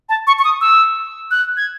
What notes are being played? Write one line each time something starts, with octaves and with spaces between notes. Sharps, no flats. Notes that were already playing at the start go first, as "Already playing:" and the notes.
A5
C#6
C#6
D#6
E6
F#6
G#6